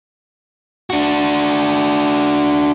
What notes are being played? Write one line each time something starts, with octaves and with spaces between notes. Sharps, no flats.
D4 F#4